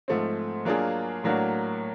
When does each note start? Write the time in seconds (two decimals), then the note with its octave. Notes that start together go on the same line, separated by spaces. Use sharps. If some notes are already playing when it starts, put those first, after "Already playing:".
0.08 G#2 F3 A3 C4
0.65 F#3 A#3 D4 F4 G#4
1.24 A2 F#3 A#3 D4 F#4